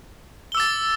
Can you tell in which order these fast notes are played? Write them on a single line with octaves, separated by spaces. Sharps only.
G7 E6 D6 A6